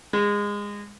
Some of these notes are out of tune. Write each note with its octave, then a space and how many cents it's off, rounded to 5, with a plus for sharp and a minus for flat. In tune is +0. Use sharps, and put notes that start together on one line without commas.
G#3 -20